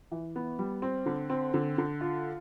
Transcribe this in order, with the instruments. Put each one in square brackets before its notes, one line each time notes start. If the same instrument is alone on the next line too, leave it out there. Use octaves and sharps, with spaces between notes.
[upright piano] E3
B3
G3
C4
D3
C4
D3
D3
F4